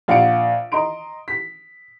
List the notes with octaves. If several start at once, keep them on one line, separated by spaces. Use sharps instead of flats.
A#1 F5 F#5 C#7 D7
D#5 A#5 C6 D7
B6